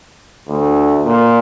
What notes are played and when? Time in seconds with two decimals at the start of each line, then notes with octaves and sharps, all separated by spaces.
0.49 D2
1.05 A#2